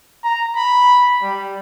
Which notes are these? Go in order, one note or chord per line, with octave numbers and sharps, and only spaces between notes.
A#5
B5
G3